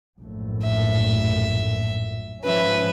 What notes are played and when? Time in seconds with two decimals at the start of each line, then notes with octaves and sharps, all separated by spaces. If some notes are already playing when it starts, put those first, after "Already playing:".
0.19 A#1 F#2 A2
0.63 E5
2.44 G#2 F3 C#4 B4 E5